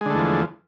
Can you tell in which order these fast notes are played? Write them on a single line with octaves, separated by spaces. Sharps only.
G#3 D3 A3 E2 F3